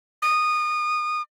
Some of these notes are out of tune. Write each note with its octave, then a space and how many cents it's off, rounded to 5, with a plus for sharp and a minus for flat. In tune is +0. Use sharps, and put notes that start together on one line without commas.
D#6 -20